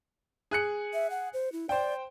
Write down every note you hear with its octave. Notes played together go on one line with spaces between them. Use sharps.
G#4 F#6 C#7
E5
F#5
C5
E4
C5 D5 G5